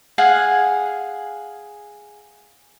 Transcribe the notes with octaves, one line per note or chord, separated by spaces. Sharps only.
G#4 F5 F#5 G#5